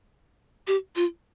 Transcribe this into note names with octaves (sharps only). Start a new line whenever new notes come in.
G4
F4